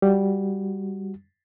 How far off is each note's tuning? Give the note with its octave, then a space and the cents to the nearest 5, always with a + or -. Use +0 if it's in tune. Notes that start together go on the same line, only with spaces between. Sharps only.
G3 +0 F#4 +0